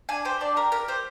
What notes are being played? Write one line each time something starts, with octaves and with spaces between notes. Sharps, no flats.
D4 G#5
G4 C5
D4 D5
G4 A#4
G4 A#4
G4 C5